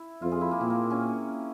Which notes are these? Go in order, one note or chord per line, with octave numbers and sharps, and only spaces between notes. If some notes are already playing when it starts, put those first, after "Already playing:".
Already playing: E4
F2 F4
G#4
E4
A#3
A#2 C4
A#3
C#4